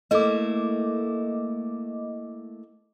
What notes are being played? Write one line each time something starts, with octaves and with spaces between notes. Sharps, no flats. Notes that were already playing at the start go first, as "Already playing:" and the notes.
A3 A#3 E4 D#5 D6